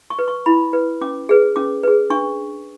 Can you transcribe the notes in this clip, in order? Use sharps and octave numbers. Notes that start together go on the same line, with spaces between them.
C#6
B4
C#6
E4 B5
B4
C#4 D6
G#4 B4
C#4 D6
G#4 B4
D4 C#6